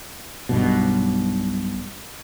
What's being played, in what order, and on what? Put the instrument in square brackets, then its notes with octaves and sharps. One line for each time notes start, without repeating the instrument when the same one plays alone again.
[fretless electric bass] B1 G2 B2